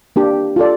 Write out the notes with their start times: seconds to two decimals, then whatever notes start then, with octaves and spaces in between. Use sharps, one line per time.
0.16 A#3 D4 G4
0.56 F4 A4 D5